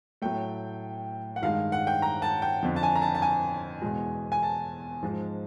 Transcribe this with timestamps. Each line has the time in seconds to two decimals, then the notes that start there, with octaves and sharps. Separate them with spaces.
0.22 A2 F#3 A3 G5
1.36 F#5
1.42 G2 D#3 G#3 F5
1.72 F#5
1.87 G5
2.02 A#5
2.22 A5
2.42 G5
2.63 F2 D3 F3
2.76 A5
2.83 G#5
2.95 A#5
3.02 A5
3.15 A5
3.22 G#5
3.82 E2 B2 G#3
4.32 G#5
4.43 A5
5.03 G#2 F3 G#3